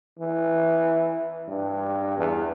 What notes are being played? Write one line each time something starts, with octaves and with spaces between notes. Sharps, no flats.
E3
G2
E2